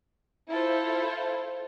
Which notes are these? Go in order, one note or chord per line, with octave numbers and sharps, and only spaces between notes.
E4 F4 A4 C5